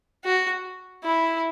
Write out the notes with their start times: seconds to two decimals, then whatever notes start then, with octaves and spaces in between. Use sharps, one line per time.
0.25 F#4
1.04 E4